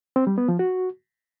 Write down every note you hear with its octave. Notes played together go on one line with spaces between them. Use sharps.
C4
G3
B3
F3
F#4